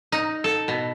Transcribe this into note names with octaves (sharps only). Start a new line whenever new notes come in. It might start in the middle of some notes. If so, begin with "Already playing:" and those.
D#4
A4
B2